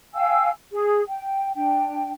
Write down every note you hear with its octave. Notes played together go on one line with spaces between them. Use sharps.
F5 G5 G#5 E6
G#4
G5
D4 G5